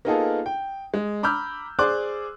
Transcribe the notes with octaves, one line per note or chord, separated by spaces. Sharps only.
A#3 B3 D#4 F4 G#4 A4
G5
G#3
A#5 B5 D6 E6 F6 G6
G#4 C5 D5 C6 D6 F#6